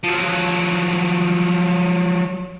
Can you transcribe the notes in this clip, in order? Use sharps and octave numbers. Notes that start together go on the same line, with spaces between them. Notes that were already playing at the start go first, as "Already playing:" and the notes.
F3 F#3